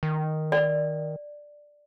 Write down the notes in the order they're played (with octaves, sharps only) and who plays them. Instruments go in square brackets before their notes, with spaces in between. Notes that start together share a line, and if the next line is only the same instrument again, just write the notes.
[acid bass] D#3
[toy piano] D5